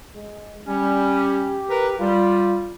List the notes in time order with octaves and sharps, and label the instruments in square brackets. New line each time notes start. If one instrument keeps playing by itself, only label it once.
[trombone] G#3
[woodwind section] G3 C#4 [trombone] G4
[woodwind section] A#4 B4
[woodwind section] G3 [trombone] F4